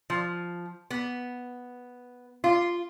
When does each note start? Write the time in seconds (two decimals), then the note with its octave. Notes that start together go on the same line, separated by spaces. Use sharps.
0.10 F3
0.90 B3
2.44 F4